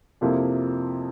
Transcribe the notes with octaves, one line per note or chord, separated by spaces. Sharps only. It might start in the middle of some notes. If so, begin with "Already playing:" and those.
F2 C3 F3 A#3 E4